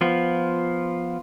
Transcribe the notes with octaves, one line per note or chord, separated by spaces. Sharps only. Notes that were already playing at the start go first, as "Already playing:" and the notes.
F3 B3 F4